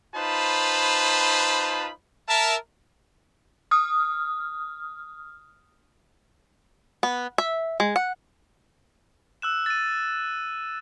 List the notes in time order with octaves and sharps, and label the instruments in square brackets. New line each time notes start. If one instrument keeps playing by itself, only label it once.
[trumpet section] D#4 F4 B4 C5 A5 B5
A#4 E5 A5
[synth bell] D#6 F6
[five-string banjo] B3
E5
G#3
F#5
[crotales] E6 F#6 E7
A6 D#7